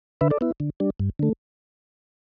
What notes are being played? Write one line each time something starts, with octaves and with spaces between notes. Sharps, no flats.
D3 B4 E5
A4 D5
B3 E4
D3
G3 D4
G2
D3 A3